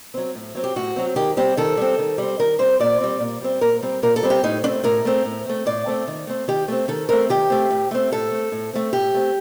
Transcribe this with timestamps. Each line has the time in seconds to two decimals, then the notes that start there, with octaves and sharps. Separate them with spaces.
0.14 F#3 C4
0.35 A2
0.55 F#3 C4
0.64 G4
0.76 A2 F#4
0.96 F#3 C4
1.16 D#3 G4
1.37 G3 C4 G4
1.57 D#3 A4
1.77 G3 C4
1.99 D#3
2.18 G3 C4
2.39 D#3 A#4
2.59 G3 C4 C5
2.80 A#2 D5
3.00 G3 C4
3.20 A#2
3.41 G3 C4
3.61 A#2 A#4
3.82 G3 C4
4.03 A#2 A#4
4.16 A4
4.23 G3 C4
4.30 G4
4.43 A2 D#4
4.64 A3 C4 D4
4.84 A2 A#4
5.05 A3 C4
5.25 A2
5.46 A3 C4
5.66 A2 D5
5.87 A3 C4
6.07 D#3
6.27 A3 C4
6.48 D#3 G4
6.68 A3 C4
6.88 D#3 A4
7.09 A3 C4 A#4
7.29 D#3 G4
7.50 A3 C4
7.70 A2
7.91 A3 C4
8.12 A2 A4
8.31 A3 C4
8.52 A2
8.73 A3 C4
8.93 A2 G4
9.14 A3 C4